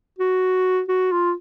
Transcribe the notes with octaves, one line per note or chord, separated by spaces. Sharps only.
F#4
F#4
F4